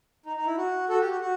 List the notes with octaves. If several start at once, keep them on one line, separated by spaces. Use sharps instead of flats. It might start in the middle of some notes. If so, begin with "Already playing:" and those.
D#4
D#4
E4
F#4
F#4 A4
G4
F#4
F#4